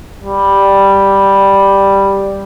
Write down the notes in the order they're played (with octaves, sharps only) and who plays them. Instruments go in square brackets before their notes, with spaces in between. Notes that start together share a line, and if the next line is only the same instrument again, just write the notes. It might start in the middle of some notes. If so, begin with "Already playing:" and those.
[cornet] G3